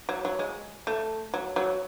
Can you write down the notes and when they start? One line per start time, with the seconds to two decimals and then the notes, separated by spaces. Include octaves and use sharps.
0.09 F#3
0.25 F#3
0.39 G#3
0.87 A3
1.34 F#3
1.56 F#3